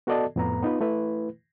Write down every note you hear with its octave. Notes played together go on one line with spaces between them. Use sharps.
B3 F#4 A4 D5 D#5 A5
F2 A2 B3 B4 A#5
B3 D#4 F4 B4
A3 E4 B4